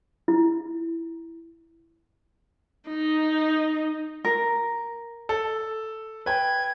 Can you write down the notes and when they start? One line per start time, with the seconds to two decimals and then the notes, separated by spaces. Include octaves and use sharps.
0.28 E4
2.89 D#4
4.24 A#4
5.29 A4
6.26 B4 G5 G#6